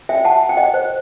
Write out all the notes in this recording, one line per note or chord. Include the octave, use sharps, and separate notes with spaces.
E5 G5
F#5 A5
G5
D#5 F#5
C5